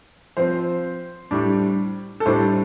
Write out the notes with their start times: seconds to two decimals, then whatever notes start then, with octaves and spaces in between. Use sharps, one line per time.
0.37 F3 C4 C5
1.31 A2 G3 D4
2.20 A4
2.25 A2 G3 D4 C5